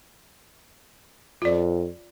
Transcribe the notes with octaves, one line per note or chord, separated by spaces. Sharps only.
F2 F4 D5